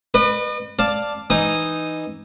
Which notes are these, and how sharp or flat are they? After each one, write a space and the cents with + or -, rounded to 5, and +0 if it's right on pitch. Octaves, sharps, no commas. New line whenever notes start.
B4 +0 D#5 -45
D5 +0 F5 +0 A5 +0
E3 +0 D#4 +0 D#6 -15